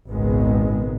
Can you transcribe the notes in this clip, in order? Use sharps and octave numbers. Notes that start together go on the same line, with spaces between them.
G#1 C#2 A#2 D#3 G#3 B3